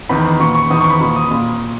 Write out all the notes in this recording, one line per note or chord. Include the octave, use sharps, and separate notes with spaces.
E2 D#3 B5
A#2 C#6
C#6
E2 D#3 D#6
C#6
B5
A#2 C#6
D#6
A#2